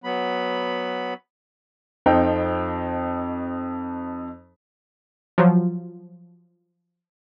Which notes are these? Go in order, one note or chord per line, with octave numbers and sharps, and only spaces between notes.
F#3 B3 B5
F2 F3 D#4 G5
F3 F#3